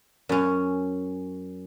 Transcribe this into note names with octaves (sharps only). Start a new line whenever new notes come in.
F#2 C#4